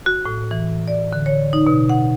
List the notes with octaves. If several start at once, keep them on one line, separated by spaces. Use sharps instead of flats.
F#4
A2
E3
D5
D3
C#5
D#4
B2
F#5